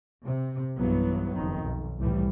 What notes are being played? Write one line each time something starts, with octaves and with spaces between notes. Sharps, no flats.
C3
B1 G2 E3 F#3 B3
F#1 F2 D#3
B1
C2 F2 A2 E3 G3